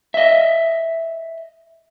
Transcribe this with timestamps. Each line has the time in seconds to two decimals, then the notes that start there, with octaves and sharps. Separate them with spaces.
0.14 D#5 E5